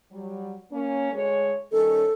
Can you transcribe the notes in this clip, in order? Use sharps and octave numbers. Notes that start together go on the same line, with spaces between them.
F#3 G3
A#3 C#4
D2 G#3 C#5
D#3 G3 C#4 A4